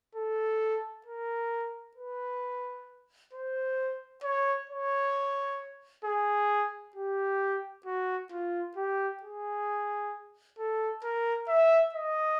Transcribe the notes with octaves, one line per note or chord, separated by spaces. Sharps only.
A4
A#4
B4
C5
C#5
C#5
G#4
G4
F#4
F4
G4
G#4
A4
A#4
E5
D#5